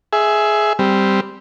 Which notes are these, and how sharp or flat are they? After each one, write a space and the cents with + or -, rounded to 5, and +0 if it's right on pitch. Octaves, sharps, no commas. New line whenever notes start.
G#4 +15 E5 +0
G3 +0 C4 -5